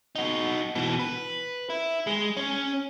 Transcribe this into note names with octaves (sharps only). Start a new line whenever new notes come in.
D#4 F#4
B2 E3
B4
E4
G#3
C#4